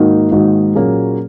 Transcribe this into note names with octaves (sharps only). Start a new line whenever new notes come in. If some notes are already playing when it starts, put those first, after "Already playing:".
Already playing: G#2 D#3 A#3 D#4 F#4
G#2 D#3 A#3 D#4 F#4
A#2 F#3 A#3 C#4 G#4